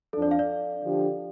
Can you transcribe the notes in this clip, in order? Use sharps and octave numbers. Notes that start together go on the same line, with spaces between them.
F2 F3 D4 A4
D5
F5
D5
D3 F3 D4 G4